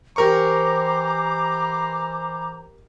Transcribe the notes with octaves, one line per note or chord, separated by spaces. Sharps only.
E3 G4 A#4 C5 A#5 C#6 D6